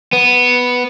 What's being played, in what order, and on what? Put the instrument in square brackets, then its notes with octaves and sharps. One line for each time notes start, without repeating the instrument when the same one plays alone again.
[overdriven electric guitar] B3